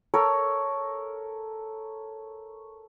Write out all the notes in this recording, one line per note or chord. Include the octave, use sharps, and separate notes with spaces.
A4 A#4 C#5